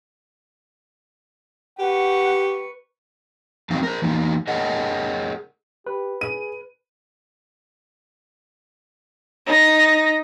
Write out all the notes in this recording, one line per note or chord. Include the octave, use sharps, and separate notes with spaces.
G4 B4 F#5 C#6
E2 F#3 C4 D#4 F5
A#4 C5
E3 A#3 D#4
G#4 A#4 C#5 D#5 F#5
G4 B4
G#4 D#7
D#4 A#6